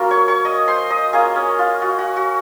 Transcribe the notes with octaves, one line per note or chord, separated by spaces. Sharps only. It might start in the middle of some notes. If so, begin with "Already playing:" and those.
Already playing: F#3 A#3 C#4 F4 A#4
C#5 C#6
C#5 C#6
D#5 D#6
C5 C6
D#5 D#6
A#3 C#4 F4 G#4 G#5
C#4 C#5
F4
F#4
F#4
F#4